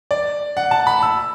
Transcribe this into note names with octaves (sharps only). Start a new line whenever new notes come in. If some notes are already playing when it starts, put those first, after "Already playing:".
D5
F#5
A5
B5
E6